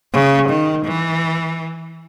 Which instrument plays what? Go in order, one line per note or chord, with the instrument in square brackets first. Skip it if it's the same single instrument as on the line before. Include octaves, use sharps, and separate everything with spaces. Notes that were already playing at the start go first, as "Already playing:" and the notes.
[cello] C#3
D#3
E3